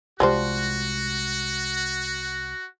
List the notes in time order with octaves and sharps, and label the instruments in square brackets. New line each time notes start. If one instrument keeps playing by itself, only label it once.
[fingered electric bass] C2 C3 G#3 [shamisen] F3 G3 C5 [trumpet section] F#4